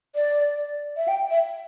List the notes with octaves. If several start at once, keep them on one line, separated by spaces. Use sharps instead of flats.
D5
E5
G5
E5